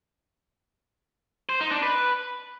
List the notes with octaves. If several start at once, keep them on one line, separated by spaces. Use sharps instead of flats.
C5
D#4
D4
B4